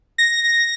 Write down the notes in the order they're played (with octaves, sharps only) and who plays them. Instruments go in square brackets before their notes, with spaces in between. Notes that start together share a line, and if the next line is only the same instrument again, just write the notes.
[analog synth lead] A#6